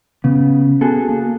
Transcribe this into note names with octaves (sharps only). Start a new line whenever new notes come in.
C#3 B3
B3 F#4 G#4 A4
A#3